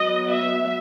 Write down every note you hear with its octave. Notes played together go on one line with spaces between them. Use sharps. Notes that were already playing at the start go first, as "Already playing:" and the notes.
Already playing: F#3 B3 D#5
E5